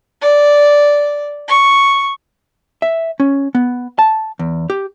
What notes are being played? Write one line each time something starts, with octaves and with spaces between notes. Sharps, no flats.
D5
C#6
E5
C#4
B3
A5
E2
G4